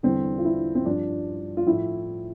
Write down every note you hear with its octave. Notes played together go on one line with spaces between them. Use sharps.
E2 D3 G3 C4
F4
E4
C4
G2 F3 D4
F4
A2 F3 E4